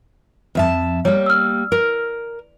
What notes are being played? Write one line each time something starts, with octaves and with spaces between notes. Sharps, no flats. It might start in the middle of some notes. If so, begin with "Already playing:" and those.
F2 E5 A5
G3 A#3 C#5
E6 F6
A#4